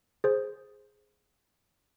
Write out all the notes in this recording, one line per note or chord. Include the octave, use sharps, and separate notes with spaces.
G#4 C5